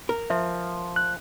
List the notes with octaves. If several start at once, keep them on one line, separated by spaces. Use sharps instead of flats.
A#4
F3 E5
F#6